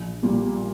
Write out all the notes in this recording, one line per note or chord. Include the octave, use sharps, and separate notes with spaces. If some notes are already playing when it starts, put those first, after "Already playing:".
Already playing: A#1
A#2 G3 A#3